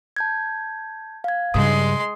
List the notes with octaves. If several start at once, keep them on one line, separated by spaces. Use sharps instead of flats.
A5 G6 G#6
F5 G#6
G2 C#3 G#3 C6 D#6